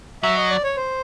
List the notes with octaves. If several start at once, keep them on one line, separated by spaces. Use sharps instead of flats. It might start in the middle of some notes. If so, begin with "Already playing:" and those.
F#3 E5
D#5
D5
C#5
C5